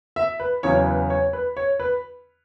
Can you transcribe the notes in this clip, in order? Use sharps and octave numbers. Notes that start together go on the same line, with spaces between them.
E5
B4
E2 C#3 F#3 C#5
B4
C#5
B4
C#5
B4